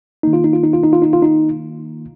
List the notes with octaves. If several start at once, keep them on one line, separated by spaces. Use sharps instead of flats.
D#3 A#3 D#4
F4
D#4
F4
D#4
F4
D#4
F4
D#4
F4
D#4